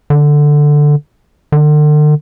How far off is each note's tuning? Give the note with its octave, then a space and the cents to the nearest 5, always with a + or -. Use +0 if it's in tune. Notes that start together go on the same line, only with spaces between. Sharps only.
D3 +5
D3 +40